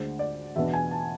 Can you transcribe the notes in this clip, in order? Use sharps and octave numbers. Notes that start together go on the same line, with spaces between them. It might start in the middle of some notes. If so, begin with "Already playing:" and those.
Already playing: D2 D3 G#3 C5
D5
E2 B2 B3 D4 E5
G#5
A5